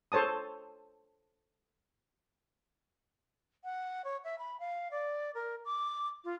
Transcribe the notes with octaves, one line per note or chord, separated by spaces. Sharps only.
A4 C5 C#5 A5 D#6
F#5
C#5
E5
B5
F5
D5
A#4
D6
F4